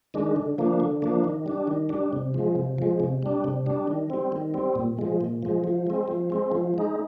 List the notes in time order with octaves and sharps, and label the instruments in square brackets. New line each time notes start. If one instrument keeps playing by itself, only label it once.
[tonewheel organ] D#3 G#3 D4
D3
F3 A#3 D4
D3
F3 A#3 D4
D#3
G3 D4
D#3
G3 D4
C3
F3 G#3
C3
F3 G#3
C3
G3 D4
C3
G3 D4
D#3
G3 C4
D#3
G3 C4
A#2
F3 G#3
A#2
F3 G#3
F3
G#3 C4
F3
G#3 C4
F3
G#3 D#4